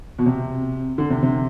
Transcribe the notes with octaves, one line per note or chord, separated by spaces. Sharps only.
B2
C3
D3
C3
C3